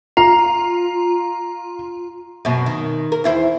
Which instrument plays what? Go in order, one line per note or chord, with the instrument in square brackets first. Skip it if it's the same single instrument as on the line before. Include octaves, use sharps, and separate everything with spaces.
[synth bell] F4 [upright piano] A#5
[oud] F#2 B2
D#3
A#4
E2 E4 C5